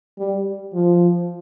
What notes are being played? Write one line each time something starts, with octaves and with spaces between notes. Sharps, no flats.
G3
F3